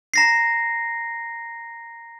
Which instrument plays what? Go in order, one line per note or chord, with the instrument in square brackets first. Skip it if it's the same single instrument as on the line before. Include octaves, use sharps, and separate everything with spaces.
[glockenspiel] A#5 A#6 C7